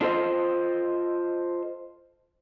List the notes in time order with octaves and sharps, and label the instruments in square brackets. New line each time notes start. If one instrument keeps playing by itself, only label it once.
[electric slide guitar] D4 F4 A4 A#4 C5 D#5